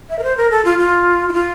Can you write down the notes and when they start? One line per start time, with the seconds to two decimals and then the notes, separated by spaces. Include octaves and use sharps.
0.10 E5
0.19 A#4
0.23 C5
0.37 A#4
0.51 A4
0.65 F4
0.78 F4
1.29 E4
1.33 F4